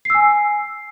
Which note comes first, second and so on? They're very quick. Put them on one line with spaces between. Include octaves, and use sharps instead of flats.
C7 E6 G#5